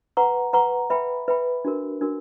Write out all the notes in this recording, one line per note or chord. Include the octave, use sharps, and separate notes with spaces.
B4 F#5 A#5 C#6
B4 F#5 A#5 C#6
B4 E5 G5 B5
B4 E5 G5 B5
D4 F#4 A#4
D4 F#4 A#4